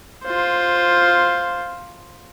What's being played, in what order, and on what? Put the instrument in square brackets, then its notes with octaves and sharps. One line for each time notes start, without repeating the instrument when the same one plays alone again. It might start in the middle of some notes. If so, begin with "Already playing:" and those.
[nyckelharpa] F4 C5